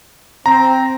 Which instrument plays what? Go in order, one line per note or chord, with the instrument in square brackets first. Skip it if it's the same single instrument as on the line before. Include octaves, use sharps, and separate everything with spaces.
[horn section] C4 [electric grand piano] A#5